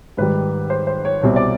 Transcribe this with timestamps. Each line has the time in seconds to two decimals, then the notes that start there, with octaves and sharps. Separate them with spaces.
0.17 G#2 D#3 G3 B4
0.70 C5
0.87 C5
1.05 C#5
1.22 C2 B2 G3 C4 C#5
1.36 D5